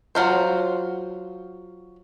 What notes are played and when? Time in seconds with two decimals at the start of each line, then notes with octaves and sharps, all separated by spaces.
0.15 F#3 F4 C5